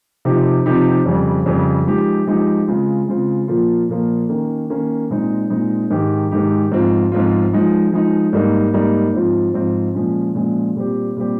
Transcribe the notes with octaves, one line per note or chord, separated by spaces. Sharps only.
C3 F3 C4 D#4 G4
C3 F3 C4 D#4 G4
F2 C#3 G3 C4
F2 C#3 G3 C4
F3 G#3 D#4 G4
F3 G#3 D#4 G4
C#3 G#3 C4 F4
C#3 G#3 C4 F4
A#2 F3 A#3 F4
A#2 F3 A#3 F4
D#3 A#3 C#4
D#3 A#3 C#4
A#2 G#3 C4 D#4
A#2 G#3 C4 D#4
G#2 D#3 G#3 D#4 G4
G#2 D#3 G#3 D#4 G4
G#2 F3 C4 F4
G#2 F3 C4 F4
F3 G#3 D#4
F3 G#3 D#4
G#2 G3 A#3 D#4
G#2 G3 A#3 D#4
G#2 F3 C4 F4
G#2 F3 C4 F4
A#2 F3 G#3 C#4
A#2 F3 G#3 C#4
A#2 G3 C4 G4
A#2 G3 C4 G4